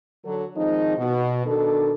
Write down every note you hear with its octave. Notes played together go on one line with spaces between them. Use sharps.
D3 F#3 A4
D#3 F3 G#3 C4 D#4
B2
B2 D#3 D4 A4